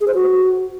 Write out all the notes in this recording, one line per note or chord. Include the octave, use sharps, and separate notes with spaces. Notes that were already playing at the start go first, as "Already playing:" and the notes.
G#4
C5
F#4